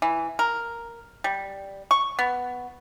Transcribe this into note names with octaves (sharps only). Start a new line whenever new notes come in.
E3
A#4
G3
C#6
B3